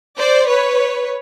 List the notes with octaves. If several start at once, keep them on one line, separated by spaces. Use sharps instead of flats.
C5 D5
B4 C#5